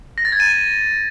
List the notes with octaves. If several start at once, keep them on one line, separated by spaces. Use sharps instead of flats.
A#6
A6
G#6
D#7